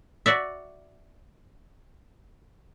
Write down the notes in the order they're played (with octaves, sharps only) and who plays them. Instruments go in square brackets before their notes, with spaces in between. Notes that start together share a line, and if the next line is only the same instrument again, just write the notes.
[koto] F#4 D5 E5